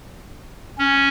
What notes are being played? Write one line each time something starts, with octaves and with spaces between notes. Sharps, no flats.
C#4